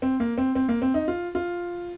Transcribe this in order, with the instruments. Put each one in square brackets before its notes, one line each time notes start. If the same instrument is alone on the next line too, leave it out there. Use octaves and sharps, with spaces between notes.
[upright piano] C4
A#3
C4
C4
A#3
C4
D#4
F4
F4